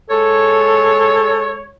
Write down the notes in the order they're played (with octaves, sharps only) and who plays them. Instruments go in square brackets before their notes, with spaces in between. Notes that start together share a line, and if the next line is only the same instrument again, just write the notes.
[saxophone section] G#3 C#5 [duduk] A4